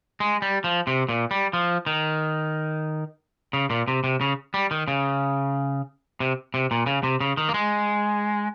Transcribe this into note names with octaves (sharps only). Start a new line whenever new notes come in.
G#3
G3
F3
C3
A#2
G3
F3
D#3
C#3
A#2
C3
C3
C#3
G3
D#3
C#3
C3
C3
A#2
C#3
C3
C#3
D#3
A#3
G#3